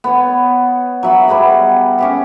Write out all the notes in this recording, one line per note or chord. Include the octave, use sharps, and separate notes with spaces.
B3 C#5
F#3 E5 B5
G3 B3 G#4 D#5
C#4 G4 E5